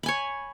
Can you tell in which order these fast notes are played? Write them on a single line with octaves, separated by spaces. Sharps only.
B5 G#5 C#5